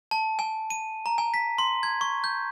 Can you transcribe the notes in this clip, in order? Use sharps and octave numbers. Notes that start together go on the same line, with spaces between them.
A5
G#5
D#7
A#5
G#5
B6
C6
G#6
C#6
G6